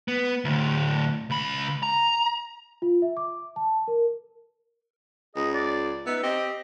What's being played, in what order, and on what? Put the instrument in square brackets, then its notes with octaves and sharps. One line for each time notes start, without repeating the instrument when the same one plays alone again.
[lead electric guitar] B3
D2 A2
C#2 B5
A#5
[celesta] F4
E5
D6
A5
A#4
[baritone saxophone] C#2 [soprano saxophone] G#4 [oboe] D#5
[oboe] D5
[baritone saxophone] B3 [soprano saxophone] D#4 [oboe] E5
[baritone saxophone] C4 [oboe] G4 [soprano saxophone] D#5